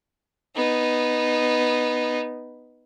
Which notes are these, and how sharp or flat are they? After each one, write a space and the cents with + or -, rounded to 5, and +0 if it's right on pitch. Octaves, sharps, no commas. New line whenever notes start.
B3 +0 D#4 -10